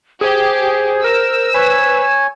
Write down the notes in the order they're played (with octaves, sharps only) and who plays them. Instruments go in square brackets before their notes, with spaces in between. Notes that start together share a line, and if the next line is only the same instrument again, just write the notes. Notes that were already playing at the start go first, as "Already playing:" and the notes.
[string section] G4 [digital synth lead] G#4 [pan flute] C5
[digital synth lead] A#4 [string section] E6
[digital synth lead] B4 [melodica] C#5 G#5